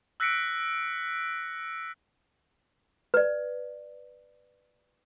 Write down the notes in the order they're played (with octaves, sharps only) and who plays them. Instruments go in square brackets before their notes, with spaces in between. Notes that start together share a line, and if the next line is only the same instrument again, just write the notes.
[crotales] E6 F#6 A#6 B6 C#7 D7
[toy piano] B4 D5